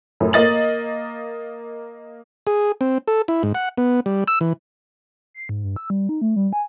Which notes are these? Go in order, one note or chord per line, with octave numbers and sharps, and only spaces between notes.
F#2 A2
A#3 D#5 A6 F#7
G#4
C4
A4
E4
G#2
F#5
B3
G3
E6
E3
C7
G#2
G2
E6
G3
D#4
A3
G3
G#5